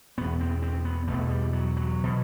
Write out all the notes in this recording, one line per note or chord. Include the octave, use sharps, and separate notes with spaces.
E2 B2 B3
C4
C4
B3
E2 B2 A3
G3
F#3
F#3
B2